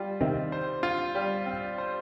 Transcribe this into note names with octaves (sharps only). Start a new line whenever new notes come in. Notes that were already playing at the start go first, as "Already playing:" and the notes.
Already playing: G3 F4
C3 D#3 C4
C5
F4
G3
C4
C5